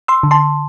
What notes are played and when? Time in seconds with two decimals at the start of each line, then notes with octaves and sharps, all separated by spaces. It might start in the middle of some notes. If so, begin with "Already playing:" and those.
0.08 C6 E6
0.23 D3
0.31 A5 C6